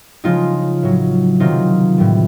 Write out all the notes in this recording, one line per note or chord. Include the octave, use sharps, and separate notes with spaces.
C#3 F3 G#3 D#4 F4
A2 F#3
C3 D#3 F#3 D#4 F4
A2 E3 G3